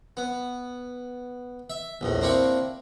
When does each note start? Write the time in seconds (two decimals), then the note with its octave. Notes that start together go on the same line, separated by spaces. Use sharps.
0.17 B3
1.70 E5
2.01 A#1 E2 A2
2.21 A#3 C4 D4 E4 C#6